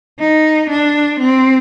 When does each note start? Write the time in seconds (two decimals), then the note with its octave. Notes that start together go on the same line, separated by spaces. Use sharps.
0.19 D#4
0.70 D4
1.20 C4